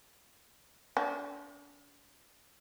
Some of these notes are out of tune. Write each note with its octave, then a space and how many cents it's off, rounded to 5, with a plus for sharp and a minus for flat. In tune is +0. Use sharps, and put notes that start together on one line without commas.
D4 -40